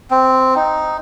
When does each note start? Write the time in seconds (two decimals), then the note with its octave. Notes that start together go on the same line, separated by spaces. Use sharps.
0.11 C4
0.56 D#4